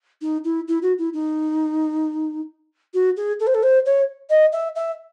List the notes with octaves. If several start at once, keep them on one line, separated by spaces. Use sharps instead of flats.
D#4
E4
E4
F#4
E4
D#4
F#4
G#4
A4
C5
A4
C5
C#5
D#5
E5
E5